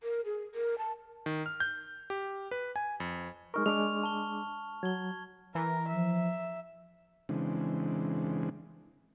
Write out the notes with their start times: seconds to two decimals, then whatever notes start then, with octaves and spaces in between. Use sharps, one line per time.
0.03 A#4
0.25 G#4
0.55 A#4
0.78 A5
1.26 D#3
1.46 F6
1.60 G6
2.10 G4
2.51 B4
2.76 G#5
3.00 F2
3.54 G#3 D#4 A#4 C#6 F6
3.66 G#3 D4 D6 F7
4.03 A5 G7
4.83 F#3 G#6 G7
5.55 E3 A#4
5.89 F3 E5
7.29 C#3 E3 G#3 C4 D4